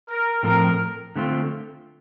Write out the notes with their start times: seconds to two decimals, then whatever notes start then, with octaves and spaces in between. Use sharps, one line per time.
0.08 A#4
0.43 A2 F3 C4 F4 A4 A#4
1.16 D3 A3 C4 F4